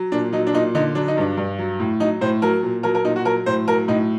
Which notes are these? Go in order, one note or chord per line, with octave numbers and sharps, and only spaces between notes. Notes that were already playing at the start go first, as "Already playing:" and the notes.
Already playing: F#3
A#2 D4
F#3 D#4
D4
A#2 D#4
D3 D#4
F#3 D4
D#4
G2 D4
G2
F#3
A2
F#3 D#4
A2 C5
F#3 A#4
A#2
F#3 A#4
A#4
A#2 D#4
F#4
F#3 A#4
A2 C5
F#3 A#4
A2 D#4